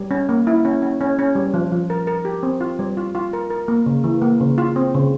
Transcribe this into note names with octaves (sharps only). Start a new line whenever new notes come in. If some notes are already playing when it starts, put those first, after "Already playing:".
Already playing: G3
C#4
A#3
E4
C#4
C#4
C#4
C#4
G3
F3
F3
A#4
A#4
G4
C4
F4
G3
F4
F4
A#4
A#4
A#3
C#3
E3
A#3
C#3
F4
C4
C#3